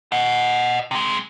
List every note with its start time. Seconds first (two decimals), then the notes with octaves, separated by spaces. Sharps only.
0.12 D#5 F#5
0.91 C3 G#3